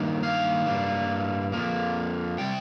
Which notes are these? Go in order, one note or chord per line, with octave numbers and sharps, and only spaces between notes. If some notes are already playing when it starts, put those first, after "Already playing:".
Already playing: G2 D#3 A#3
F5
G2 G3 A#3
F2 F3 A#3
C3 G3 G5